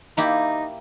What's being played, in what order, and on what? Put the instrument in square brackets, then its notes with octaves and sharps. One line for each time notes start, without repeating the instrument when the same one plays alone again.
[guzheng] A#3 E4 G4 [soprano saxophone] D#4